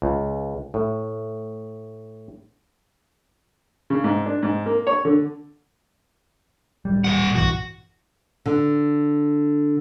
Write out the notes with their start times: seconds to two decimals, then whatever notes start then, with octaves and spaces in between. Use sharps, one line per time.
0.02 C#2
0.74 A2
3.90 C#3
4.04 G#2
4.26 D4
4.42 G#2
4.66 A#3
4.87 C#5
5.05 D3
6.85 D1 G3
7.04 A#2 F#5
7.36 A#1 G2 E3 F#4
8.46 D3